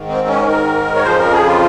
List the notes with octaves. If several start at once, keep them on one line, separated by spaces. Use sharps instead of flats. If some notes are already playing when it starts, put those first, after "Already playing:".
Already playing: G#2 D#3
C4
C#4
A#4
C#5
F2 C#3 F3 C5
A#4
G#4
F4